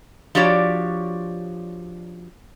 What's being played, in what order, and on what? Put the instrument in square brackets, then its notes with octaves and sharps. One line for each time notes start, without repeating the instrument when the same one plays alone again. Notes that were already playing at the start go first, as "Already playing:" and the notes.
[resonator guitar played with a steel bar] F3 D4 F#4 G4 C#5 D5